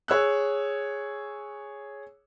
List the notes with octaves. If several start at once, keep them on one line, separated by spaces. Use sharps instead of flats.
G#4 C#5 E6 F#6